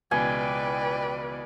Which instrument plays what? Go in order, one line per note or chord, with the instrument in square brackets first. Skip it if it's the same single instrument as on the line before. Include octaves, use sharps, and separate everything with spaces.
[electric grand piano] C#2 B2 E3 [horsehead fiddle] B4 D5 [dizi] G5 [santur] G#5